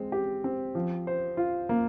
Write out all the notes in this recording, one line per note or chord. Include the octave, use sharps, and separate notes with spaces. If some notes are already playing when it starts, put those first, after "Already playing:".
Already playing: G#3 C4
G4
C4
F3
C5
F4
A#3